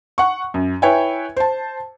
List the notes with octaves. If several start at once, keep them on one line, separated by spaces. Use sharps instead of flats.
F#5 C#6
F#2
E4 B4 C#5 E5 G5 G#5
C5 A5